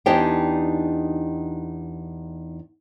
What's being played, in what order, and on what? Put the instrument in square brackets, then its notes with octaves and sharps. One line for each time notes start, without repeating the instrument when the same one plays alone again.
[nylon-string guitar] E2 D4 D#4 G4 D5 G5